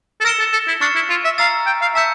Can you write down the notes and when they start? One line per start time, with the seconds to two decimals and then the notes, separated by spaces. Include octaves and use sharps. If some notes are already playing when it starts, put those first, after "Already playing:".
0.20 A4
0.24 A#4 E6 A#6 C#7 E7 G7
0.39 A4
0.53 A4
0.68 E4
0.81 D4 C#6 F6 A6 C#7
0.95 E4
1.10 F4
1.24 E5
1.38 F5 A#5 E6 A6
1.66 G5
1.81 F5
1.95 E5 A5 E6 G6 C#7